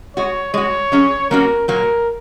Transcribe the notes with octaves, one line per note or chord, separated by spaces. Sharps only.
G#3 F#4 C#5
G#3 F#4 C#5
F#3 C#4 G#4
F#3 A#3 C#4 F#4 A#4
A#2 F#3 A#3 A#4